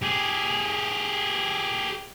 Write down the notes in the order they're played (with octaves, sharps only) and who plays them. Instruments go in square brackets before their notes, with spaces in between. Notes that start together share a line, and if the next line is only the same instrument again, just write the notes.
[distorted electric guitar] G4 G#4